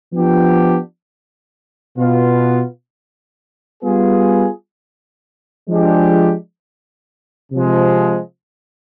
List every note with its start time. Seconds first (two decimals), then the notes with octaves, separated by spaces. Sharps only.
0.13 F3 B3 D4 G4
1.98 B2 B3 F4
3.83 G3 B3 F4 G#4
5.68 F3 G#3 D4 G4
7.53 C3 F3 G#3